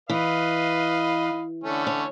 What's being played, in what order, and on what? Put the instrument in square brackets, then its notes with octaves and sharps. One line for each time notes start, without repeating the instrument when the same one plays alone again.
[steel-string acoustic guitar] E3 [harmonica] B4 D#5 F5
[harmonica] D3 A3 C#4
[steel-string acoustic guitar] C#5